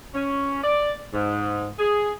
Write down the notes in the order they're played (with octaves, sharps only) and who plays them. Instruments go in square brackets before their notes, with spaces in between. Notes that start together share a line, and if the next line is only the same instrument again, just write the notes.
[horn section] C#4
D5
G#2
G#4